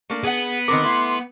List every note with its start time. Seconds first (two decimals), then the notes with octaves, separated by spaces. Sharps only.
0.10 A3 A#3 D4
0.24 B3 G#4 F#5
0.68 D#3 C4 A#4 D6
0.83 A3 E4 C6